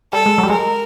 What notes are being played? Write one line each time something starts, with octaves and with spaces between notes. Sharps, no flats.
G3 A4
G#3
F#3
G3
G#3 A#4